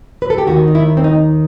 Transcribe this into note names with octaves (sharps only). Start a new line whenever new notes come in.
B4
A4
G4
D#2 D#3 F#4
D#4
E4
C4
D#4